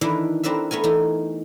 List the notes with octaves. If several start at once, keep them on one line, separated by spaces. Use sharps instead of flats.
D#3 E3 D4 E4 B4 A#5
C4 D4 A#4 B4 E5
A3 B3 A#4 G#5
E3 D#4